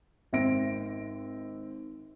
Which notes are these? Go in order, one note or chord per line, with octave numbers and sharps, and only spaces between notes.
G#1 C4 E5 A#6 D7